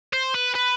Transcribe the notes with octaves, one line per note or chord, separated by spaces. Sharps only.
C5
B4
B4